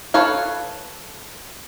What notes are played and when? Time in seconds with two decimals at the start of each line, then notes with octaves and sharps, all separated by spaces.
0.14 A4 B4 C#5 F5